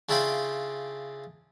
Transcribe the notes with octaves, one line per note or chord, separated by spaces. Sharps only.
C#3 D4 E4 F4 G5 B5